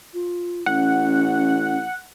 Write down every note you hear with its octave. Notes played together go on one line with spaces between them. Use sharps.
F4
A1 C#4 F#5